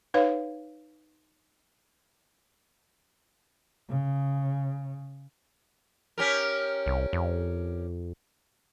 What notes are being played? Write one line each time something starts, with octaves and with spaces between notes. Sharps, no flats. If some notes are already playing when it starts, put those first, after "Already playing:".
D#4 B4 C#5 F5
C#3
C#4 G4 A#4
C2
F2